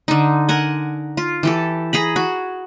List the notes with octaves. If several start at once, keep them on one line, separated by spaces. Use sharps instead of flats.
D3 D#4
A#4 F#5 G#5
F4
E3 G4 A4
G#4 A#5 B5
F#4